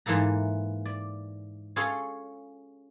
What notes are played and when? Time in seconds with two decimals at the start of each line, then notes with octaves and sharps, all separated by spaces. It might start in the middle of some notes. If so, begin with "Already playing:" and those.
0.06 G#2 E3 A#3 A4 A#5
0.86 D5
1.76 C#4 F4 G#4 A4 C#5